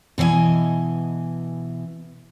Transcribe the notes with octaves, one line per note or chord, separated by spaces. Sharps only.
B2 E3 C#5 D#5 G#5